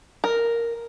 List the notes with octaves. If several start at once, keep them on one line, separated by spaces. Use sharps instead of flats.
A#4